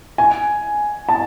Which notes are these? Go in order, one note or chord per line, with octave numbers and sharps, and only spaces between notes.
G#5
A5